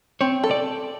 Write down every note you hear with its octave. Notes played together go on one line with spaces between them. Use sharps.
C4 C#5
A4
D5